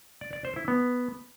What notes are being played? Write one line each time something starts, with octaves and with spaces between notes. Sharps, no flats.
D5
D5
C5
E4
B3